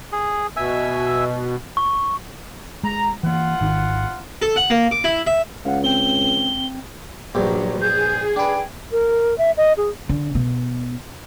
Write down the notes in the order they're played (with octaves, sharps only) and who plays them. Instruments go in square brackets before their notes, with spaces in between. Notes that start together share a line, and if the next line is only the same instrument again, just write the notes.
[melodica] G#4
[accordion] B2 [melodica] E5 G#5 E6
[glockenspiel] C#6
[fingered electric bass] G#3 [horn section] A#5
[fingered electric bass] E3 A#3 [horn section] F4 F#5
[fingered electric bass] G#1 D#3
[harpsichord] A4
F#5
A#3
D6
E4
E5
[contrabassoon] C#2 [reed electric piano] F5 F#5
[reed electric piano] C4 G5 [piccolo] G7
[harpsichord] A#1 G2 [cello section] F3 F#3
[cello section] G#4 [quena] G6
[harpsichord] D4 B4 [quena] G5
[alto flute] A#4
E5
D#5
G#4
[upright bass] D3
B2